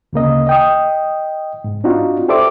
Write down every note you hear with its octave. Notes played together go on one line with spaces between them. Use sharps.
D2 C#3 A#3 D#5
D#5 G5 D#6
G#2
C4 D4 D#4 F4 F#4
G4 A4 C5 D5 E5 D6